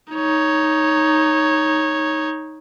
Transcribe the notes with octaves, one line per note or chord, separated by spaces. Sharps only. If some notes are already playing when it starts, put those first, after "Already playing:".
D#4 C#5